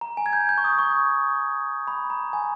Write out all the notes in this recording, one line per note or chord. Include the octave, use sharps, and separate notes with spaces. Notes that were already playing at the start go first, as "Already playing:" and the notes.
A#5
G#5
G#6
G6
G6
C#6
D#6
C#6
B5
A#5
G#5